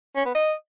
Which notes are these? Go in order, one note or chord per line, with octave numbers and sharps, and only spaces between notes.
C#4
B3
D#5